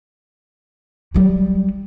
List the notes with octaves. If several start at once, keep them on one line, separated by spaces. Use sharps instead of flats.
F#3 G3